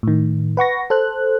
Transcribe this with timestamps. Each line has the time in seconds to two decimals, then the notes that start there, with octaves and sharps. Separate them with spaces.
0.03 A2 D#3
0.57 B4 F#5 C#6 A#6
0.90 A4 C5 F#6